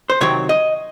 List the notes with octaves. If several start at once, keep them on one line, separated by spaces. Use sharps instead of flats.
C5
C3 D#3 F#3 C4 C#5
D#5